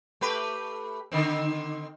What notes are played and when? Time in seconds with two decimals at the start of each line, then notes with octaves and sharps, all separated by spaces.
0.21 A3 G4 B4
1.12 D3 D#3 C4